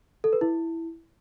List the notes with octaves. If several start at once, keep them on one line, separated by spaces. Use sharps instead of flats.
A4
B4
E4